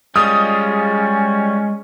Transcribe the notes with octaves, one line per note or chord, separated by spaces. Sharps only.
G3 G#3 C#4 F4 D#6